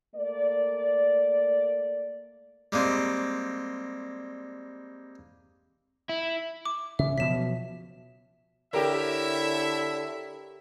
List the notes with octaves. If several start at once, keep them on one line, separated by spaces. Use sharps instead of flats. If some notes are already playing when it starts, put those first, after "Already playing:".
A3 A#3 D5
G3 G#3 A#3 C4
E4
D6
C#3 E5
B2 F3 F#3 B6 E7
D3 E4 G4 A#4 C#5 E5